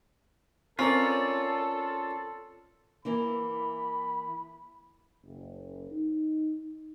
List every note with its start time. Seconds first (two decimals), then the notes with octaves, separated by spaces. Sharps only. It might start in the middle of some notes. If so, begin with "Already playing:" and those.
0.79 C4 C#4 F4 A4 A#4 C#5 D5
3.05 E3 A#3 E4 B5
5.24 F#1
5.90 D#4